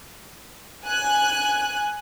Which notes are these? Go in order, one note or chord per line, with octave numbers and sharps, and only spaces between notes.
G#5 F#6